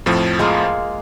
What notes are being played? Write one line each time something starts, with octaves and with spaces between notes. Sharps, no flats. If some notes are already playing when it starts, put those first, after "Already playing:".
F2 A2 F3
G#3 A#3 F4